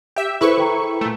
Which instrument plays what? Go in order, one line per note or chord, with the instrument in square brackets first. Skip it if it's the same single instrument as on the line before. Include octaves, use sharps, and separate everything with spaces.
[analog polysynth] G4 E5
[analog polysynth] E4 B4 C#6 [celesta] G#4 A4 C5
[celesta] A4 G5 A#5
[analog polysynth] A#2 A3